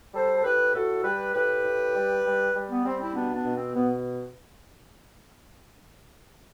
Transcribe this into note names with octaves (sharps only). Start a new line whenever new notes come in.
G3 A4 C5
A4
A2 G4 B4
A2 F#4 A4
G3 G4 B4
A2 G4 B4
A2
G3
G3
G3
B3
G3 C4
C4 E4
B2 B3 D4
B3 D4
B2
C4
B2 B3